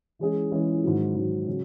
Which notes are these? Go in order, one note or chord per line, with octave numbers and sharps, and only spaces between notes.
E3 G#3 C#4 G#4
E3 G#3 C#4 G#4
G#2 D#3 F#3
G#2 D#3 F#3
C#3 F#3